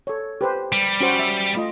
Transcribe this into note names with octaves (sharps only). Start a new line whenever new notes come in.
A4 C#5
G4 B4 C5
G3
C#4 F#4 C5
E5
A3 F4 D#5